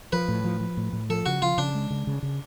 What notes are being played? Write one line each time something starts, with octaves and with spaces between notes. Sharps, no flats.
F3 B4
A2
F3
F3
A2
A2
F3 A4
C#3 F#4
F3 F4
C#3 D4
G#3
C#3
C#3
C#3